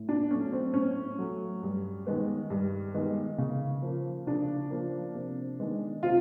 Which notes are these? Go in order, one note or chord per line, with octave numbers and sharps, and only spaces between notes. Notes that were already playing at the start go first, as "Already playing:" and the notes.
Already playing: A2
D4
F#3 A3 C#4
C4
A2 C#4
F#3 A3
G2
D#3 G#3 B3
G2
D#3 G#3 B3
C#3
F3 A#3
C#3 D4
F3 A#3
C3
D#3 G#3 B3
C3 F4